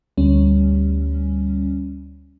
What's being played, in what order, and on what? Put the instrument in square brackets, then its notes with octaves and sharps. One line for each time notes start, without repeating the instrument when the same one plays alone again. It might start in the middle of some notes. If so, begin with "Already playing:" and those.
[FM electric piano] D2 G3 C#4